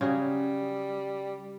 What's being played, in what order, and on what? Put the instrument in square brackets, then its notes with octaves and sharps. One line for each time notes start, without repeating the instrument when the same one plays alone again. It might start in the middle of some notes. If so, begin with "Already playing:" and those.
[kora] C#3 F#3 G#4 [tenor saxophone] G3